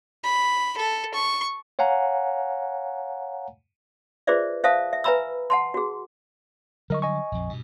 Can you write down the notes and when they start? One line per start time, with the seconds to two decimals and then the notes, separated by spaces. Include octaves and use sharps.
0.23 B5
0.77 A4
1.14 C#6
1.79 C#5 F5 F#5 G#5 A#5
4.27 F4 G#4 B4 C5 D5 E5
4.64 C5 E5 F5 A5 D#6
4.93 E5
5.04 B4 E5 G#5 A#5 B5 E6
5.50 F#5 A5 C6
5.74 F#4 G#4
6.90 D3 F#3 G3 A#4 D#5 C#6
7.02 D#5 G#5 C#6
7.32 A#1 F2
7.49 G2 B2